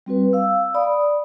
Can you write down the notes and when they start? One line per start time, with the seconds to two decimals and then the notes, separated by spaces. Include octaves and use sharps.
0.06 G3 C4 F#4 B4
0.33 F5 E6
0.74 D5 B5 D#6